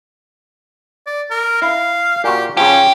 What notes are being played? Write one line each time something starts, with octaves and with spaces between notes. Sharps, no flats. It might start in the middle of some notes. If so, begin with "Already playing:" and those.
D5
A#4
E4 F5
A#2 F#4 G4
C#3 F3 C#4 G4